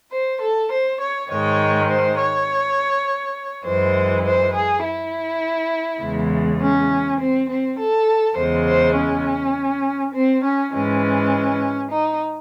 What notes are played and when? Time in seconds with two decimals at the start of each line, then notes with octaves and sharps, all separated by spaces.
0.12 C5
0.41 A4
0.71 C5
1.00 C#5
1.29 G#2 D#3 G#3 C#5
1.89 C5
2.18 C#5
3.65 F#2 E3 G#3 C5
4.24 C5
4.54 G#4
4.83 E4
6.01 E2 C#3 E3 G#3
6.60 C#4
7.19 C4
7.49 C4
7.78 A4
8.37 E2 C#3 G#3 C5
8.67 C5
8.97 C#4
10.14 C4
10.43 C#4
10.73 G#2 E3 G#3 C#4
11.91 D#4